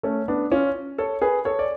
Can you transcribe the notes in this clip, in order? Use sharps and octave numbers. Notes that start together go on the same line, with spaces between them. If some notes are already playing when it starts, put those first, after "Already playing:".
A3 C#4
B3 D4
C#4 F4
A4 C#5
G#4 B4
A4 C#5
D5